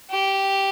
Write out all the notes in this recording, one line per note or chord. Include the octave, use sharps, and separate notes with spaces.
G4